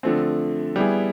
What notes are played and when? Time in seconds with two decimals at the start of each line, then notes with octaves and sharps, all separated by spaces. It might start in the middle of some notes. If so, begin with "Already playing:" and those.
0.03 D3 F3 A3 C4
0.76 G3 B3 E4 G#4